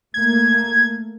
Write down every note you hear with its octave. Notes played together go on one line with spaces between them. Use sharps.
A3 A#3 G#6